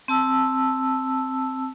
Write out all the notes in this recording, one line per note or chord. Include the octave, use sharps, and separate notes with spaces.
C4 A5 E6